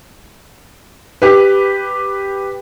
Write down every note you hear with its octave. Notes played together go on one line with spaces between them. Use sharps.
G4 B4